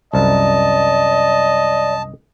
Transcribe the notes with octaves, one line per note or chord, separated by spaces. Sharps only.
C2 F#2 D5 D#5 A5